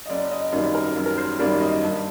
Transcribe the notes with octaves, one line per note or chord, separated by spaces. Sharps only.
D#5
F#1 D5
D#5
F#2 D#3 G3 A#3 D5
A#4
F#1
A#4
C5
F#2 D#3 G3 A#3 D5
D#5
G2